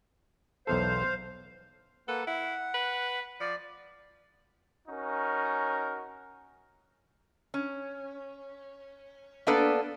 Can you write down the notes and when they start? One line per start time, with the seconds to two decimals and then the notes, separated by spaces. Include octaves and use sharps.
0.67 B1 E2 A4 C5 F5
2.08 A#3 A4 B4 F#5
2.27 E4 F#5
2.74 B4
3.40 F3 D5
4.88 C#4 D#4 F#4 A#4
7.54 C#4
9.47 A#3 B3 D4 A4 B4 D5